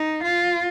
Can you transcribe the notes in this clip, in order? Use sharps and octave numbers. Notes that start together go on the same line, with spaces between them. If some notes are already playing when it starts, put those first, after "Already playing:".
Already playing: D#4
F4